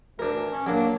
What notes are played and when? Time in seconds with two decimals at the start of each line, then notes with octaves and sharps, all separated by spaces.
0.19 D2 D4 A#4
0.34 E3
0.52 C#4
0.66 F#3 A#3 D4